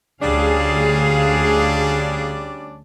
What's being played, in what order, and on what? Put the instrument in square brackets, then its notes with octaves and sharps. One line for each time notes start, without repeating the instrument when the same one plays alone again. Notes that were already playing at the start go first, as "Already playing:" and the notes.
[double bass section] D2 [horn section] G3 C#4 D4 [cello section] G#4 F5